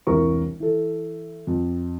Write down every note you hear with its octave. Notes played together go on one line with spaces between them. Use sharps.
E1 C2 E3 A#4 C#6
E3 A4
F2